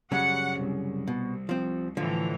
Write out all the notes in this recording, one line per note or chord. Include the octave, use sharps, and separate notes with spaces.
F#2 C#3 G3 F#5
C2
B2
F3 C4
A2 D3 E3 F3